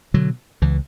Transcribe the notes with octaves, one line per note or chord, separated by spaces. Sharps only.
B2 D3 F#3
C#2 E3